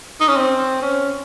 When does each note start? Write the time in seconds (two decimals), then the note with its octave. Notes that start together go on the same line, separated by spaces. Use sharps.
0.21 D#4
0.28 C#4
0.36 C4
0.82 C#4